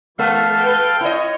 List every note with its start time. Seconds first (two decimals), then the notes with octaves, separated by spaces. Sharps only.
0.19 E3 G#3 A4 F5
0.60 B4 G5
1.01 E4 C#5 D#5